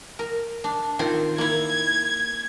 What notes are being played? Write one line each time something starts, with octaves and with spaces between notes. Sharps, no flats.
A#4
D4
D#3 C4 F4
A#3 E4 G#6